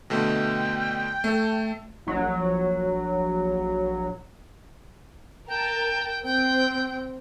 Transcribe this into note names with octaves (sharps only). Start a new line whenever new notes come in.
B2 D3 A3 G5
A3 A4
A#1 F#3
A#4 G5 A5
C4 G5